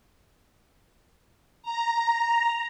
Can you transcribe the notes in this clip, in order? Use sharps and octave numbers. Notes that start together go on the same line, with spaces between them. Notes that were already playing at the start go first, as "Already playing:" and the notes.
A#5